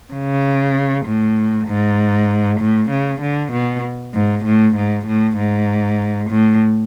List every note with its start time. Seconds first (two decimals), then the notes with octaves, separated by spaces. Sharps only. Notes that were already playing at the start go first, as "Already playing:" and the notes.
0.13 C#3
1.06 A2
1.67 G#2
2.60 A2
2.90 C#3
3.21 D3
3.52 B2
4.14 G#2
4.45 A2
4.76 G#2
5.07 A2
5.37 G#2
6.30 A2